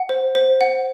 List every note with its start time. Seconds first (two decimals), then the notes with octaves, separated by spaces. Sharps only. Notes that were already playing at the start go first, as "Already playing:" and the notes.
Already playing: F#5
0.09 C5
0.35 C5
0.61 F#5